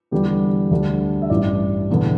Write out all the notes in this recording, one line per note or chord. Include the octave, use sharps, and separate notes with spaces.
E2 D3 G3 G4
D2 D3 G3
E5
A1 G2 E3 G3 D5
E1 E2 D3